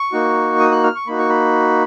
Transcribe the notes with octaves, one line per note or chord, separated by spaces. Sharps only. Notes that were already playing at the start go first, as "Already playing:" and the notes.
Already playing: C#6
A#3 D#4 F#4
D#6
F#6
F6
C#6
A#3 D#4 F#4 B5
C#6
B5